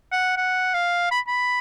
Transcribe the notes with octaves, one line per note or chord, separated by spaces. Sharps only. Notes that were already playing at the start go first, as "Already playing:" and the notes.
F#5
F#5
F5
B5
B5